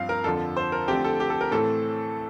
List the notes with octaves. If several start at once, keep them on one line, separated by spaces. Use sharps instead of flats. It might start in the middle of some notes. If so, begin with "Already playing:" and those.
Already playing: G2 F3 C4 F5
A#4
F2 D3 F3 A4
C5
A#4
D3 F3 A3 C4 G4
A4
G4
A4
A#4
A2 E3 A3 C4 A4